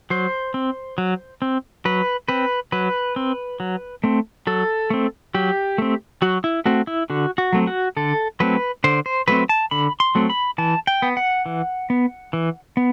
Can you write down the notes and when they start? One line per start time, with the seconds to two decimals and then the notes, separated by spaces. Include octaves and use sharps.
0.10 F#3 C5
0.54 C4
0.98 F#3
1.42 C4
1.85 F#3 B4
2.28 C4 B4
2.72 F#3 B4
3.16 C4
3.60 F#3
4.04 A3 C4
4.47 F#3 A4
4.90 A3 C4
5.34 F#3 G4
5.78 A3 C4
6.22 F#3 F#4
6.44 E4
6.66 A3 C4 F#4
6.87 E4
7.10 D3 F#4
7.38 F#4
7.53 F#3 A3 C4
7.67 F#4
7.97 D3 A4
8.40 F#3 A3 C4 B4
8.84 D3 C5
9.06 C5
9.28 F#3 A3 C4 B4
9.49 A5
9.71 D3 B5
10.00 C6
10.15 F#3 A3 C4
10.30 B5
10.58 E3 A5
10.87 G5
11.02 B3
11.17 F#5
11.46 E3
11.90 B3
12.33 E3
12.77 B3